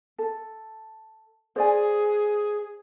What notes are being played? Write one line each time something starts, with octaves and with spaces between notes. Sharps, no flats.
A4
G#4 C5 D5 G#5